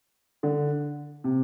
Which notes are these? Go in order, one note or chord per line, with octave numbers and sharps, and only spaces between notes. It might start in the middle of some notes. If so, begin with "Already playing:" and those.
D3
C3